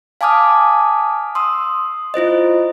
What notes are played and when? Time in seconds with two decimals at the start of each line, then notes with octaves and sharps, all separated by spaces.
0.21 F5 G#5 A5 D6 D#6 F6
1.35 C6 D#6 E6
2.14 E4 F4 C5 D#5